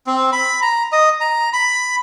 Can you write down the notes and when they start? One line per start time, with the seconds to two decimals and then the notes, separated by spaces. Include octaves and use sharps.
0.07 C4
0.32 B5
0.62 A#5
0.92 D#5
1.21 A#5
1.53 B5